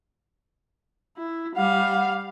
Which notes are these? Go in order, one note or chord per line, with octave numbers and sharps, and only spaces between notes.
E4
G3 F5 F#5